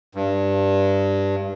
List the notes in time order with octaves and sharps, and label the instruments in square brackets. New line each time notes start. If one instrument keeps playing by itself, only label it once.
[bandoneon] G2